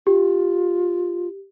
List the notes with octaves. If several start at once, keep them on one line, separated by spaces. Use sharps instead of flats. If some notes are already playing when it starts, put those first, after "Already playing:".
F4 G4